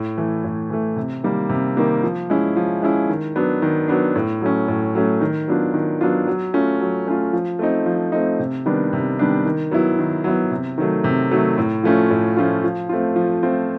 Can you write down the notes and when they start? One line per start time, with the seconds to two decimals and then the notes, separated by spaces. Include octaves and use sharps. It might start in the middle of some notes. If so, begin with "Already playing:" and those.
Already playing: A2
0.18 E3 A3
0.44 A2
0.70 E3 A3
0.96 C3
1.24 D#3 G3 A#3
1.49 C3
1.77 D#3 G3 A#3
2.03 F3
2.30 G#3 C#4 E4
2.56 F3
2.82 G#3 C#4 E4
3.10 D#3
3.36 F#3 B3 D4
3.62 D#3
3.88 F#3 B3 D4
4.16 A2
4.42 F#3 A3 C#4
4.68 A2
4.95 F#3 A3 C#4
5.21 D#3
5.48 F#3 B3 D4 F4
5.74 D#3
6.01 F#3 B3 D4 F4
6.27 F#3
6.54 A3 C#4 F4
6.80 F#3
7.06 A3 C#4 F4
7.33 F3
7.59 A3 C4 D#4
7.86 F3
8.12 A3 C4 D#4
8.39 C3
8.66 D#3 G3 B3 D4
8.93 C3
9.19 D#3 G3 B3 D4
9.45 D#3
9.71 F#3 B3 E4
9.99 D#3
10.24 F#3 B3 E4
10.52 C3
10.78 D#3 F#3 A3
11.04 C3
11.31 D#3 F#3 A3
11.58 A2
11.83 F3 A3 C#4 F4
12.10 A2
12.37 F3 A3 C#4 F4
12.64 F3
12.89 A3 C4 F4
13.16 F3
13.43 A3 C4 F4